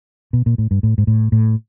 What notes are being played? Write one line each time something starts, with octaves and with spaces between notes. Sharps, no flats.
B2
A#2
A2
G2
A2
G#2
A2
A2